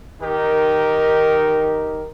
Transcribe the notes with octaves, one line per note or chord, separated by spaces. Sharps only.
D#3 D#4 G4 A#4